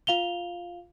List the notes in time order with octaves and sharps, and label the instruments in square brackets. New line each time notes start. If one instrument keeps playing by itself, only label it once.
[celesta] F4 F5 F7 G7